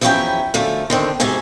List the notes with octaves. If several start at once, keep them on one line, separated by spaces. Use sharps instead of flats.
E2 F3 F#3 C#4 E4 G5
F#2 D3 F3 A3
D3 D#3 C4
G#2 C3 F#4 A4 G#5